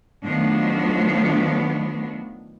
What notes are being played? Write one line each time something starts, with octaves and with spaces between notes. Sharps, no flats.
D#3 F3 F#3 A3 B3 D4